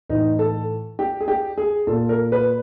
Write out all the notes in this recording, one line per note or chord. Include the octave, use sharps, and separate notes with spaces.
A2 E3 D#4
A4
G4
G#4
G4
G#4
A#2 A4
A#4
B4